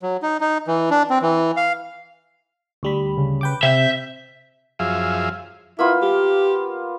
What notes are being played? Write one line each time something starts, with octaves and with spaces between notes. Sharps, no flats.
F#3
D#4
D#4
E3
D4
C4
E3
F5
D2 G3 B5
C#3
B4 G5 D6
C3 C4 E5 G6
F#2 F3 G#4 E5 F5
A#3 B3 E4 F4
G4